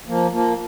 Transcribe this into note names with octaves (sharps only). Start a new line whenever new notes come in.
F3 A#3
F3 A#3